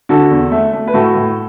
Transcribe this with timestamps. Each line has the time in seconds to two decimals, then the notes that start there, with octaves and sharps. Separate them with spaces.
0.09 D3 F#4 A4
0.31 E2
0.51 A3
0.73 A3
0.87 B4
0.94 A2 F#4 A4
1.15 A2